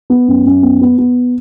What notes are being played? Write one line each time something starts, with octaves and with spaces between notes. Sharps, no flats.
B3
F#2
F#2
B3
B3
B3